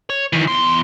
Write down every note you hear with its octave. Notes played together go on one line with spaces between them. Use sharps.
C#5
D#3 E3
E2 C6